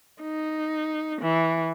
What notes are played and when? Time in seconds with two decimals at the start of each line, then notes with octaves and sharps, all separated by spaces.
0.22 D#4
1.21 E3